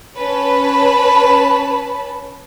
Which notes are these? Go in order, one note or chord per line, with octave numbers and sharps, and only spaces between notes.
C#4 B4 A5 B5